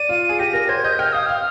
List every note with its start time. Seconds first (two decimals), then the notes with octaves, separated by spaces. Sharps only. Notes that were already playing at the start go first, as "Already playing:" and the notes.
Already playing: D5 D#7
0.09 F4
0.29 G#4
0.39 G4 A#6
0.54 A#4
0.69 C5 G#6
0.84 D#5 G6
0.99 G5 F6
1.13 F5 D#6
1.26 F5 F6